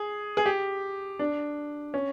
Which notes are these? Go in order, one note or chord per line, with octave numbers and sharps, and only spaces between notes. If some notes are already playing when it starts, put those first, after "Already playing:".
Already playing: G#4
G#4
G4
D4
C#4